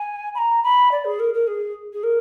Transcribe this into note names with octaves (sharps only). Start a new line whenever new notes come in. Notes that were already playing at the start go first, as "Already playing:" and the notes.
Already playing: G#5
B5
A#5
B5
D5
G#4
A#4
A#4
G#4
G#4
A#4